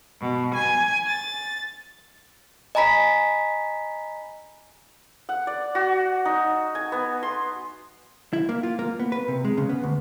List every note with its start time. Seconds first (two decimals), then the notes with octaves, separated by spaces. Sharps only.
0.21 B2
0.55 G#5
1.06 A6
2.75 D#5 G#5 A#5 B5 B6
5.29 F#5
5.47 D5
5.75 F#4
6.25 D#4
6.75 G#5
6.92 B3
7.23 C6
8.33 E4
8.49 A#3
8.63 F4
8.79 A#3
8.99 B3
9.12 B4
9.28 C3
9.45 G#3
9.57 C#3
9.69 B3
9.84 D2